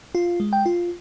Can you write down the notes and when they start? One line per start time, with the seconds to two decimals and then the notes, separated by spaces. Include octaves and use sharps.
0.15 F4
0.40 G#3
0.53 G5
0.66 F4